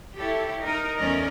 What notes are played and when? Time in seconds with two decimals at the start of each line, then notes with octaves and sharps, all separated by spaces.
0.16 E4 G4 A4 C#5
0.61 D#4 A#4
0.98 E2 A3 C#4 A#4 D5 D#5